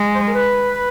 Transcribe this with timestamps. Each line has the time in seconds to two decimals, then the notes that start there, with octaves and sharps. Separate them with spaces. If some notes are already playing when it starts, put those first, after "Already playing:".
Already playing: G#3
0.15 C5
0.27 A#4
0.34 B4